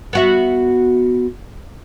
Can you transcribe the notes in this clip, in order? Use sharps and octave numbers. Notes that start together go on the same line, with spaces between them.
B3 F#4 E5